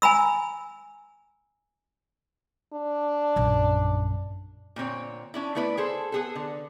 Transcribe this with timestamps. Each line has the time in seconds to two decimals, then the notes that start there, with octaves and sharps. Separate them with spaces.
0.02 G#5 A#5 B5 E6
2.73 D4
3.36 A#1 F#2
4.76 A#2 D3 C4 C#5
5.34 C#4 D4 E4
5.55 A3 B3 E4 B4 D5
5.77 G#4 A4 C5
6.12 B3 G#4 A4
6.35 D3